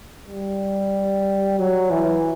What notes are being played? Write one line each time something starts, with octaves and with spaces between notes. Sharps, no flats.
G3
F#3
E3